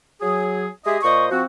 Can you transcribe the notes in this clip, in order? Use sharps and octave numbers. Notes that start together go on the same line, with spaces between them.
F#3 G#4
G#3 G4 G#4 D#5 E5
A#2 C5 D#5 C#6
F3 C4 F#4